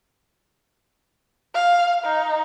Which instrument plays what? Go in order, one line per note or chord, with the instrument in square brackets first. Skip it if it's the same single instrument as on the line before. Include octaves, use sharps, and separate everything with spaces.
[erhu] F5
D#4